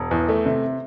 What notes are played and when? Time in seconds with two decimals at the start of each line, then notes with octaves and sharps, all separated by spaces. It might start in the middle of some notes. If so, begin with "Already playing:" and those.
Already playing: E1
0.11 E2
0.29 A3
0.46 C3